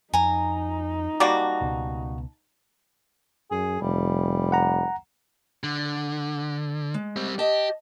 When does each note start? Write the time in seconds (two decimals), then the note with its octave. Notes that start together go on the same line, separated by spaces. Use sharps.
0.14 F2 D#4 G#5 A#5
1.20 G3 A#3 F#4 A5
1.61 C#2 B2
3.51 F#2 G#4
3.81 F1 G3
4.52 F#5 A#5
5.64 D3
6.94 G#3
7.16 G3 C4
7.39 G4 D#5 A5